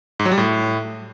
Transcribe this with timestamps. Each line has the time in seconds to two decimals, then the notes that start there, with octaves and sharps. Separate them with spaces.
0.19 G#2
0.25 F#3
0.32 G3
0.38 A2